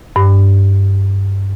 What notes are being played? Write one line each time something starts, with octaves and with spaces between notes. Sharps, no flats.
G2